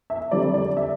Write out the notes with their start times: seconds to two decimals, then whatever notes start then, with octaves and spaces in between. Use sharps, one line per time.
0.10 E5
0.31 D3 G3 C4 D5
0.54 D5
0.77 E5